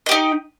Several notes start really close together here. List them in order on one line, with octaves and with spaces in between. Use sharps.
D#5 G4 D#4